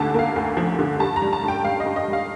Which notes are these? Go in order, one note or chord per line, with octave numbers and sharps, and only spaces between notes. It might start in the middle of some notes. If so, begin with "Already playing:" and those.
Already playing: D2 D3 A5
A#3 F5
D2
F3
D3
G2 A5
A#5
G3
A5
G2
G5
G3 F5
D#5
G2
D#5
G3
F5